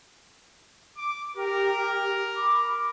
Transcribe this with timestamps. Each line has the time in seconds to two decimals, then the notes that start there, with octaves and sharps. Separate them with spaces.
0.97 D6
1.36 G4 A#4
2.35 B5 D6